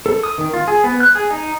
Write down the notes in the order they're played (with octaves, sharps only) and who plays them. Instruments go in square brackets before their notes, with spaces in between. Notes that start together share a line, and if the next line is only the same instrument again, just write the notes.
[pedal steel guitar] A4
D#6
D#3
F4
G#4
B3
F#6
G#4
D#4